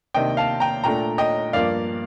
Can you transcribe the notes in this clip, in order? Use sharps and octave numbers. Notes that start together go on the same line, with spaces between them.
C3 D#3 A#3 D4 D#5 G5
F5 A5
G5 A#5
A#2 A3 D4 G5 A#5
D#5 G5
G2 F3 A#3 D4 D5 F5